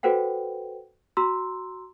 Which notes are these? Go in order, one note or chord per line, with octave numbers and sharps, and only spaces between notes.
F#4 A4 B4 C5 F#5 G5
F#4 A#5 C6 E6